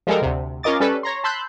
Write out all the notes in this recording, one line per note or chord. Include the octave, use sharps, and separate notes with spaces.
F3 G3 G#3 A4 A#4
D2 C3
C#4 F4 A#4 D#5 D6 A6
G3 C#4 A4 B4 D5
C#5 A#5 C6
A5 B5 C6 E6 F#6 G6